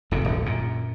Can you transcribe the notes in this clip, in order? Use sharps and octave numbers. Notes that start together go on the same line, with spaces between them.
F1 G#2 C3
D1 D3
F#2 A#2